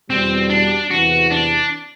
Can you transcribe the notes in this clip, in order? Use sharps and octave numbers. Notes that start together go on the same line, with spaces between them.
E2 B2 G3 C4
D4
E2 C3 E3 F#4
D4